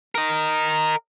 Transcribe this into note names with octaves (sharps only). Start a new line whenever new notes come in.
A#4 D#5